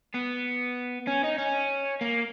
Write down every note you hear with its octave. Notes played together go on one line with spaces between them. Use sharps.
B3
C#4
D#4
C#4
A#3